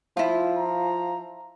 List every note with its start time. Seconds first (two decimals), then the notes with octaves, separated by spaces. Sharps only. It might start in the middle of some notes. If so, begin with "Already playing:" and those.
0.17 F3 E4 F4
0.58 A#5